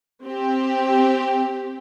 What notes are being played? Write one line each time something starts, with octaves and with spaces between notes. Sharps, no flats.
C4 G4